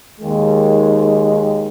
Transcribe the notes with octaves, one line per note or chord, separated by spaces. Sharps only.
D#2 D#3 G#3